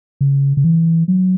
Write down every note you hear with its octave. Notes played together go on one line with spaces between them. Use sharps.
C#3
C#3
E3
F#3